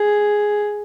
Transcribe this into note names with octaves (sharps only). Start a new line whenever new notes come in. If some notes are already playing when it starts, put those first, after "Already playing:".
Already playing: G#4